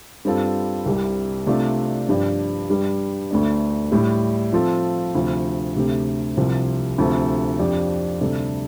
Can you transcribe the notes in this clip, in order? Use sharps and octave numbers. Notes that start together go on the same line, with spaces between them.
G2 G3 C4 F4 A4
C2 C3 G3
C3 A3 D4 F4 D5
G2 F3 D4 G4 D5
G2 G3 D4
D2 D3 A3 D4
A2 G3 D4
F3 C4 F4 A4
D2 C3 F3
D2 C3 A3 C4 G4
C2 C3 F3 C4
D2 C3 F3 C4 A4
F2 F3 D4 G4
D2 C3 G3 D4 A4